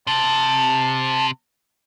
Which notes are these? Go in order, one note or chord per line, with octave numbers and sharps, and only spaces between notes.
C3 A5